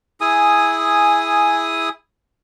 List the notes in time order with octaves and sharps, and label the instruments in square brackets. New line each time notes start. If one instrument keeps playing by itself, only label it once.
[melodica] E4 G#4 G#5 D#6